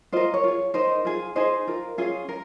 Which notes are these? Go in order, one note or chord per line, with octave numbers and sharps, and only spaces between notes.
F4 A#4 C5 D#5
C#5
F4 G#4
D#4 A#4 C5 D#5
F4 G#4
D#4 G#4 C5 D#5
F4 A#4
C#4 F4 G#4
A#4